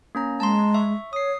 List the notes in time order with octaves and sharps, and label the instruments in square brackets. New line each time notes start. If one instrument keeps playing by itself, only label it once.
[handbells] A#3 C#4 A#5
[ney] G#3 [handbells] A5 A#5 C6
[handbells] E5 C#6
[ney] C#5 [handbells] D#6 C7